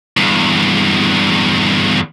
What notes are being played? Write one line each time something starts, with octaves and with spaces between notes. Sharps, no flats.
E2 G2